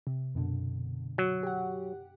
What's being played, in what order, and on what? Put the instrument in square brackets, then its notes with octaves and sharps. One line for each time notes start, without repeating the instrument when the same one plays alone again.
[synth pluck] C3
F#2 B2 D3
[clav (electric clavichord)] F#3
[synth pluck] G4 F#5